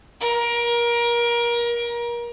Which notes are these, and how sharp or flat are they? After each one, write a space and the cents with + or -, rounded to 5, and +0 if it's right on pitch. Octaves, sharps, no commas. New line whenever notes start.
A#4 +25